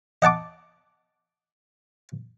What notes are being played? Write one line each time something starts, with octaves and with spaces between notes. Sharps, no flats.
D#5 F#5 A5 D6